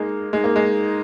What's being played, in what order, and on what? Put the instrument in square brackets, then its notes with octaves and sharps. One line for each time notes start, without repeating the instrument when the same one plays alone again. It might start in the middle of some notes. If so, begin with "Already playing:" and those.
Already playing: [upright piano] G#3 A#3 [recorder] D#4
[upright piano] G#3 [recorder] D#4
[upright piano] A#3
G#3